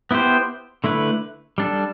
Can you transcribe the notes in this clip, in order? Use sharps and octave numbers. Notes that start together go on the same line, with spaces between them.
B3 E4 G4 C5
D3 A3 E4 B4
G3 D4 A4